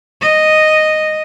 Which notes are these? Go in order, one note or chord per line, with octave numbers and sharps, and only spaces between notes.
D#5